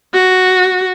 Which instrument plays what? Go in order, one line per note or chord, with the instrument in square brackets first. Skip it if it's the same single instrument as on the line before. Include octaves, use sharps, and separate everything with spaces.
[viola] F#4